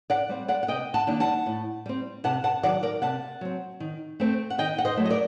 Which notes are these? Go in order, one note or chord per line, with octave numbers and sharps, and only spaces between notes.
D5 F#5
G3 C4
D5 F#5
F#5
C3 D#5 G5
F#5 A5
D#3 G3 A#3 D4
F#5 A5
A2
G3 C4
C3 F#5 A5
F#5 A5
D#3 F#3 D5 F#5
A#4 D5
C3 F#5 A5
F#3 C4
D#3
A3 C4
F#5
D#3 D#5 G5
F#5
C5 D#5
F#3 A3
D#5
A#4 D5